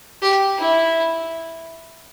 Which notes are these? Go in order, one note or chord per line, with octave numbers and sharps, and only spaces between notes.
G4
E4